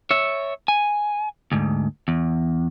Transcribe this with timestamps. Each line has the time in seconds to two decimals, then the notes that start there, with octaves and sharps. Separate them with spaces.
0.11 C#5 E5
0.68 G#5
1.52 D2 G#2
2.08 E2